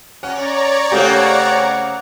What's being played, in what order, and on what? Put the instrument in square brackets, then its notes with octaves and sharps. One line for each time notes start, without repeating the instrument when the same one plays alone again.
[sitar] C#4 [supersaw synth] C#5 D5 A#5 [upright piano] F#5
[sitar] C#3 A#3 C4 [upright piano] A3 G4 [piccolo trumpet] F#5